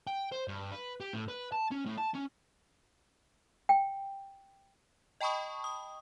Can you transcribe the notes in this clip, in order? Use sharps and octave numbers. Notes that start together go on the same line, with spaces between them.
G5
C5
G2
B4
G4
A2
B4
A5
C#4
A2
A5
C#4
G5
D#5 G5 A5 B5 C#6 D#6
D#6